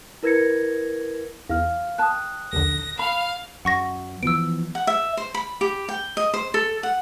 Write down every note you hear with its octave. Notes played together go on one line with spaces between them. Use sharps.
E4 A#4 B4 G#6 A#6 C#7
E2 F5 F6
G5 A5 D#6 F#6
A#1 D#2 D3 A#6
F5 B5
F#2 F#5 C#6 A#6
E3 F3 B3 E6 D7
F#5
E5
C5
B5
G4
G5
D#5
C5
A4
F#5